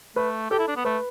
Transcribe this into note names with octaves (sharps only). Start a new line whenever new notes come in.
A3 B4
G4 A4
E4
D4
B3
A3 B4